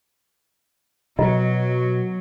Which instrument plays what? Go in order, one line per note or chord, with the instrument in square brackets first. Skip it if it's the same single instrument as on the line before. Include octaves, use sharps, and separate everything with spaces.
[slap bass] B2 [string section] F#3 [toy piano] D#5 A#5